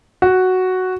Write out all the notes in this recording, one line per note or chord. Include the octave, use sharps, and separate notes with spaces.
F#4